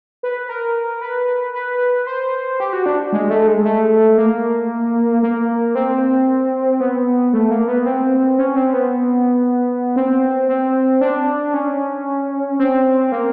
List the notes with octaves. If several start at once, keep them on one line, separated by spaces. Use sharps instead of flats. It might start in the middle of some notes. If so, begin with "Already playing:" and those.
B4
A#4
B4
B4
C5
G4
F#4
D4
G#3
A3
G#3
A3
A#3
A#3
C4
B3
A3
A#3
B3
C4
C#4
C4
B3
C4
C4
D4
C#4
C4
A#3